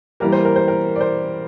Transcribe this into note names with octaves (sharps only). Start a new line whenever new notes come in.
E3 G3 A#3 A#4
C5
A#4
C5
A#4
D5
C5